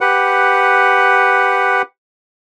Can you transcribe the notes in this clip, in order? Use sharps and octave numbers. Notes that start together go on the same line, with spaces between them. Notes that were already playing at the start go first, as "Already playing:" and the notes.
G4 B4 F#5